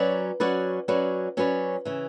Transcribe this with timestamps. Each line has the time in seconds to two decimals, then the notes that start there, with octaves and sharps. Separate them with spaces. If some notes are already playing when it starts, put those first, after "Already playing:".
Already playing: F#3 C#4 F#4 B4 D5
0.40 F#3 C#4 F#4 B4 D5
0.88 F#3 C#4 F#4 B4 D5
1.37 F#3 C#4 F#4 B4 D5
1.85 C#3 E3